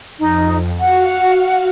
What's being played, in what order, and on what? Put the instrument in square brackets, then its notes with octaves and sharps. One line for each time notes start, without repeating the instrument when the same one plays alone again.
[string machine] F2 [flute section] D#4
[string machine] F#4 F5 [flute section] F#5